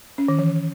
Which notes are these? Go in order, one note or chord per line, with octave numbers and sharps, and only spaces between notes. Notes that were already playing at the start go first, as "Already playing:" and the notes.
C#4
D#3
E3